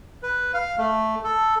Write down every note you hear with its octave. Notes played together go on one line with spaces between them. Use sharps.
B4
F5
A3
A4